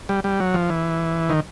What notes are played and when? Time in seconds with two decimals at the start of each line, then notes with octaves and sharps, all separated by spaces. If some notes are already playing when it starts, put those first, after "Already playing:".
0.09 G3
0.24 G3
0.40 F#3
0.54 F3
0.69 E3
1.29 D#3